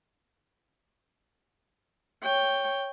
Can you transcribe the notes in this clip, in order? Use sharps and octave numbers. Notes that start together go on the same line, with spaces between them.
C#5 G5